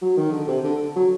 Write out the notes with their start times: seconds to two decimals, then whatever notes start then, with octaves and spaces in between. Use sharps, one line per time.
0.02 F#3
0.17 D#3
0.32 D3
0.48 C3
0.64 D3
0.96 F#3